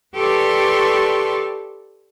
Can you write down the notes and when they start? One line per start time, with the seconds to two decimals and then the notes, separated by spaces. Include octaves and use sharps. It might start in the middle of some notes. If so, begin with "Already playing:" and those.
0.14 G4 A4 B4 D5 C6 C#6